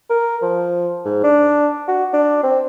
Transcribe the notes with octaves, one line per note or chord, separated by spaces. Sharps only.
A#4
F3
G#2
D4
F#4
D4
C4